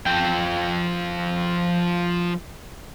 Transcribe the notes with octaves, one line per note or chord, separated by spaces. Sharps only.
F3 G5